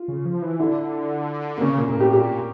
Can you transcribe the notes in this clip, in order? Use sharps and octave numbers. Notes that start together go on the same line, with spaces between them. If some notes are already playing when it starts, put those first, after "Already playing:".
Already playing: F4
C#3
F3
E3
D3 E4
A#3
C#3 C#4
A#2 A#3
A#2 A#3
A2 G4
A#2 G4